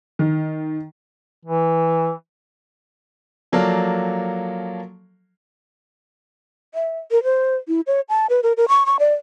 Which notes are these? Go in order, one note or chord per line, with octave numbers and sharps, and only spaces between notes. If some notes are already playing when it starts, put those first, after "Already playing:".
D#3
E3
F3 F#3 A#3 A4 D5 F5
E5
A#4
C5
E4
C#5
A5
B4
A#4
A#4
C#6
C#6
D5